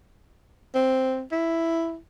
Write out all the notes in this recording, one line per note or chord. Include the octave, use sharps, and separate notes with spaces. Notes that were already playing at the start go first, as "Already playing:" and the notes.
C4
E4